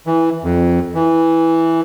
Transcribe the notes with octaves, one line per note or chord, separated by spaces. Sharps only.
E3
F2
E3